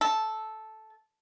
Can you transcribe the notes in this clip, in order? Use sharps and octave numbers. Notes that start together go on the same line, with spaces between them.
A4